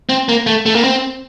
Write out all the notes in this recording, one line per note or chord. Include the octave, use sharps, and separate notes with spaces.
C4
A#3
A3
A3
A#3
C4